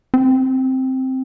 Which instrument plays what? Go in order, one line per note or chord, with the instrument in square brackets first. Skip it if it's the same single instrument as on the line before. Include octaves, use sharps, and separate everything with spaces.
[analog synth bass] C4